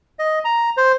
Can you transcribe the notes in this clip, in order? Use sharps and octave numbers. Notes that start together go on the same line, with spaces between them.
D#5
A#5
C5